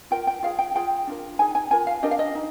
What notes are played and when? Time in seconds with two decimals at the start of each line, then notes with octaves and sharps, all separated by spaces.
0.11 F4 A#4 G5
0.27 G5
0.43 F4 G#4 F5
0.59 G5
0.75 F4 G#4 G5
1.07 D4 F4 A#4
1.39 D#4 G#4 G#5
1.55 G#5
1.71 F4 A#4 G#5
1.87 F5
2.03 D4 G4 A#4 D#5
2.11 F5
2.19 D#5
2.35 D#4